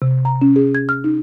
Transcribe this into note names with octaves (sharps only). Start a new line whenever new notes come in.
C3
A#5
C#4
G#4
G#6
F6
D#4